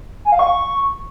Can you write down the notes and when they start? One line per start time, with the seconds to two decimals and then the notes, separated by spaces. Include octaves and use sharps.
0.25 G#5
0.32 F5
0.39 C#6